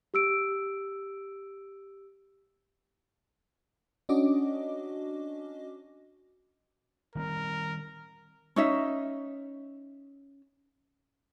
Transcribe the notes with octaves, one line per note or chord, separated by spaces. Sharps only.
G4 E6 D7
C#4 D4 F#4 D#5 D6
D#3 G3 C4 A#4
C#4 D#4 E5